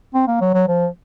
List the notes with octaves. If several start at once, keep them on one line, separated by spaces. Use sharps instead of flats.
C4
A#3
F#3
F#3
F3